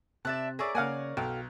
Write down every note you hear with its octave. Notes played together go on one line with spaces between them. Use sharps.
C3 D5 E5 A5 F#6
G#4 A#4 C#5 D5 E5
C#3 A#3 F5 F#5 G#5
B1 F#4 A4 F5 G5